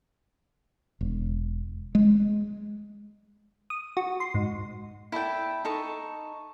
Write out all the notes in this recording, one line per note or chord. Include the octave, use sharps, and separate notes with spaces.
E1
G#3
D#6
F#4
C6
G#2
E4 A4 D5 G5
D#4 A4 C#6